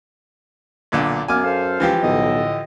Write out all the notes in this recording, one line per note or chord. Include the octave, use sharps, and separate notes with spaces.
B1 A#2 D3
F#2 A#3 B3 G#5 D6 F6
A4 C5 F5
C#2 E3 F3 G4
B1 A2 D3 D#5